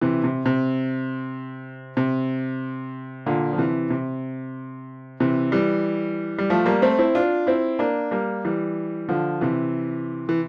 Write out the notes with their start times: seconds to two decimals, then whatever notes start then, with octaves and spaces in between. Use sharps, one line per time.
0.01 C3 E3
0.24 C3
0.46 C3
1.97 C3
3.26 A#2 D3
3.53 F3
3.58 C3 E3
3.90 C3
5.20 C3 E3
5.52 E3 G3
6.39 G3
6.50 F3 A3
6.66 G3 A#3
6.82 A3 C4
6.99 C4 E4
7.15 D4 F4
7.47 C4 E4
7.79 A#3 D4
8.11 G3 A#3
8.45 E3 G3
9.09 D3 F3
9.41 C3 E3
10.29 E3